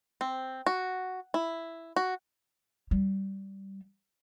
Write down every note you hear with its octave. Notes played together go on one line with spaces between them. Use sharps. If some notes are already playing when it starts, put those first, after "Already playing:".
C4
F#4
E4
F#4
G3